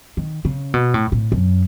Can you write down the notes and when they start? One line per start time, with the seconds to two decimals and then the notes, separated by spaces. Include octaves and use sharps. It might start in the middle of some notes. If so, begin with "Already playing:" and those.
0.17 D#3
0.45 C#3
0.74 B2
0.94 A2
1.12 A2
1.32 F#2